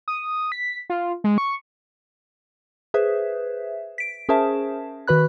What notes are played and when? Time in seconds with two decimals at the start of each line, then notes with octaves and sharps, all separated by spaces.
0.08 D#6
0.52 B6
0.90 F4
1.24 G#3
1.38 C#6
2.94 G#4 B4 C5 E5
3.98 B6 D7
4.29 C#4 G#4 A#4 C5 E5 A5
5.07 D#3 F#4 B4 B5 F#6